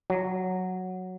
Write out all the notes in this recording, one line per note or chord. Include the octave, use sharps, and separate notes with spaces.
F#3